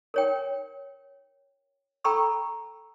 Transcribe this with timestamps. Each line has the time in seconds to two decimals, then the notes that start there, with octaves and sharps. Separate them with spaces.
0.14 A#4 C#5 G5
2.04 A4 G5 A#5 B5 C#6 E6